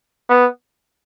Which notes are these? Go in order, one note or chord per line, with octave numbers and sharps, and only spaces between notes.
B3